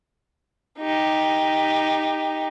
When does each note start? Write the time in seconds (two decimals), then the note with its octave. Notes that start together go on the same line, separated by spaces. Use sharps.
0.78 D#4 G4